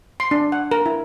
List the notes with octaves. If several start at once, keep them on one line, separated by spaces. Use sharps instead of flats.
C6
D4
F#5
A#4
E4